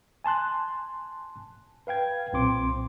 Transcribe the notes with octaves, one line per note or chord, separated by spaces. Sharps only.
G#5 A5 C6 F#6
B4 F5 G5 G#6
B1 A#2 C4 C6 D6